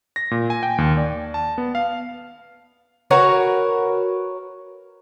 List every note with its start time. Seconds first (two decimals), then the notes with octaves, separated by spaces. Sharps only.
0.16 A#6
0.31 A#2
0.50 G#5
0.63 G5
0.78 D#2
0.97 D5
1.34 A5
1.58 B3
1.75 F5
3.11 F#4 A#4 B4 C#5